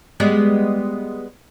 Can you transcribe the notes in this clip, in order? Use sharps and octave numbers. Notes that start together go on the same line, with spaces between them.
G3 G#3 B3